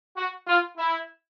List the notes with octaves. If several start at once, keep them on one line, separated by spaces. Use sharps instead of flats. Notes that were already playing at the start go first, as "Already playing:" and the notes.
F#4
F4
E4